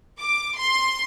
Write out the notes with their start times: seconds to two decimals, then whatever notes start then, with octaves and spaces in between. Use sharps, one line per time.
0.20 D6
0.58 C6